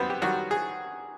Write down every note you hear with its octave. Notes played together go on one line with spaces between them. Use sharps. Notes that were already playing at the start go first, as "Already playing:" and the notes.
Already playing: F#2 D#3 G3 B3 C4 B4 C5
G4
D#3 F#3 G3 F#4
G#4